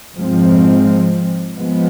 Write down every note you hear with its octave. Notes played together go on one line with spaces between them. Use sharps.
G#2 F3 G#3 C4
F3 G#3 B3